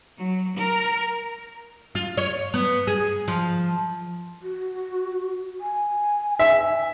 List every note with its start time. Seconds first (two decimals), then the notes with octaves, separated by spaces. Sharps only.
0.18 F#3
0.57 A#4
1.95 F4
2.17 C#5
2.54 B3
2.87 G#4
3.28 F3
4.42 F#4
5.61 G#5
6.39 E5